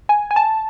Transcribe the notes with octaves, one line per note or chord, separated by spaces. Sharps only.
G#5
G#5
A5